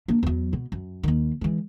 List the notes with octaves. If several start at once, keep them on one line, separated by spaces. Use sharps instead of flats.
A#3 D4
E2 F#3
B2
F#2
D#2 D#3
E3 G#3